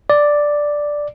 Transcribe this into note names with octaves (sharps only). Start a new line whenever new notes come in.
D5